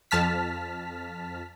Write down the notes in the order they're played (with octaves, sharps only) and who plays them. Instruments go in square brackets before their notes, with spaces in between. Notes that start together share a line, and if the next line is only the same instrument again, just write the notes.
[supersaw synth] F2 A5 F6 B6